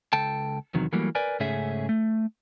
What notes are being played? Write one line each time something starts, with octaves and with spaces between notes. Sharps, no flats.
C#2 A4 G5 A5
E2 C3 D#3 F#3
E3 F#3 G3 A3 A#3
A#4 B4 D5 G#5
G#2 C#3 A3 C#4 G#4 E5
A3